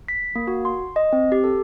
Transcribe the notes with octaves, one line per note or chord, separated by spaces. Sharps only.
B6
A#3
F#4
C6
D#5
C4
G4
A4